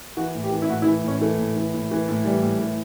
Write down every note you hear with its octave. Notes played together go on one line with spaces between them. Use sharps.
E3 F#4
A2
G4
E3
E4
A2 F#4
E4
E3
A2 C#4
E3 A3
A2
E3
A2
E3
A2
E3 G3
A2
E3